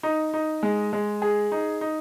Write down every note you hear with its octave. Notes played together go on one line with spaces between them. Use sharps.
D#4
D#4
G#3
G#3
G#4
D#4
D#4